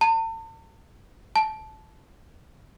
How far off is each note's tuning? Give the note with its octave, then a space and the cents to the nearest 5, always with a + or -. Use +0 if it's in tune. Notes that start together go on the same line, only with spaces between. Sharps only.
A5 +40
A5 -15